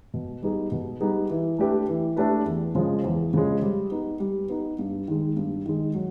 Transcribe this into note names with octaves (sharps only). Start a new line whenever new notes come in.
B2
G3 B3 D#4 G#4
B2
G3 B3 D#4 G#4
E3
A3 D4 G4 B4
E3
A3 D4 G4 B4
E2
C#3 F3 G#3
E2
C#3 F3 G#3
G3
B3 D#4
G3
B3 D#4
G2
D#3 G#3
G2
D#3 G#3
F#3